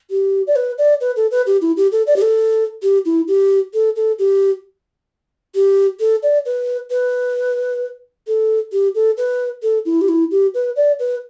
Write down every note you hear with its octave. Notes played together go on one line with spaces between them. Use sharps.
G4
D5
B4
D5
B4
A4
B4
G4
E4
G4
A4
D5
G4
A4
G4
E4
G4
A4
A4
G4
G4
A4
D5
B4
B4
A4
G4
A4
B4
A4
E4
G4
E4
G4
B4
D5
B4